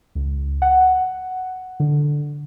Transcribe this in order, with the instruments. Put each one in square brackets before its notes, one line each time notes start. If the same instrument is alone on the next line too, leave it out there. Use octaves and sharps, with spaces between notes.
[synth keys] C#2
F#5
D3